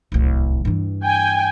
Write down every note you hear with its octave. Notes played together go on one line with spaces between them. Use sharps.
D1 C2
G2 E3
G5 G#5